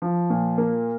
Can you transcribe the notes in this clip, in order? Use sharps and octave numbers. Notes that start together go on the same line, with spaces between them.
F3
A#2
A#3